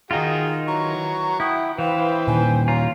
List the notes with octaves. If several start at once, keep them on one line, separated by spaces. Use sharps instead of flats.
D#3 D#4 F4 F#4 G#4 G5
E3 F#3 A#5 C#6
E4 F#5 G5 D#6
E3 B4 C5 F5 G5
A#2 D#3 G#5
F4 C#5 A#5